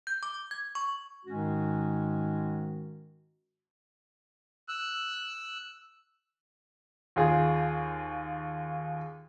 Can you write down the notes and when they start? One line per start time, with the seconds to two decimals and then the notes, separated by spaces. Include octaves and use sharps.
0.07 G6
0.23 D6
0.51 G#6
0.75 C#6
1.26 G#2 D#3 G#3 C#4 F#4
4.68 E6 F#6
7.16 D#2 F4 G#4